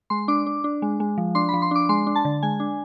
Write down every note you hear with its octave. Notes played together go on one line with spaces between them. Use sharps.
G#3 C6
D4 D6
D4
D4
G#3
G#3
F3
D4 C6
B5
F3
C6
D4 D6
G#3 C6
D4
A5
D3
G#3 G#5
D4